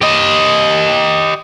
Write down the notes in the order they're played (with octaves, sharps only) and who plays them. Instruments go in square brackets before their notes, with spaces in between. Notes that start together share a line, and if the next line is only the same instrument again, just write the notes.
[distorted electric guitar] G4 D#5